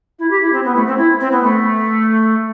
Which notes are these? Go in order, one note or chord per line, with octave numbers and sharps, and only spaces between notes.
E4
G4
E4
C4
B3
A3
C4
E4
C4
B3
A3